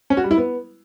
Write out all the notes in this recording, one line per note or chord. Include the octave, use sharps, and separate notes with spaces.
C#4
F#4
G3
E4
B3